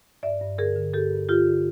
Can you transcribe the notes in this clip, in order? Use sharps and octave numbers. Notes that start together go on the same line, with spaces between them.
G2 D5 E5
G2
D3 G#4 A#4
D3
G2 G4 A4
G2
D3 F4 G4
D3